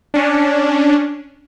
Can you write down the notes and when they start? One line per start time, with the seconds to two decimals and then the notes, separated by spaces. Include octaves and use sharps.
0.14 C#4 D4